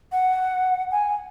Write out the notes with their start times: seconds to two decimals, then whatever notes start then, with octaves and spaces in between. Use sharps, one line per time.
0.12 F#5
0.91 G#5